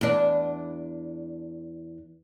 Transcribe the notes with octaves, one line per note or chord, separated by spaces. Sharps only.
E2 D4